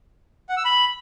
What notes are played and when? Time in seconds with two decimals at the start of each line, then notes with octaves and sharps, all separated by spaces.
0.49 F#5
0.57 E6
0.65 B5